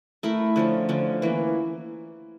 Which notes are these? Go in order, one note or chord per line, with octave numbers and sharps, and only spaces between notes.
A3 E4 A#4
D3 F3 C#4
D3 F3 C#4
E3 A#3 C#4